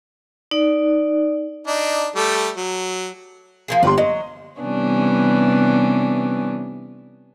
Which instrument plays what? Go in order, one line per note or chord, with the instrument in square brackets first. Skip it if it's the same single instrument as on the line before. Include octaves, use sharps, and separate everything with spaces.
[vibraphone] D#4 D5
[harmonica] D4 D#4
G3 A3 A4
F#3
[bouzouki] F3 A#3 G#4
[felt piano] G1 G4 C6 [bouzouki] B4
[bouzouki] F#3 [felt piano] D#5
[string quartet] C3 E3 G3 B3 C#4 D4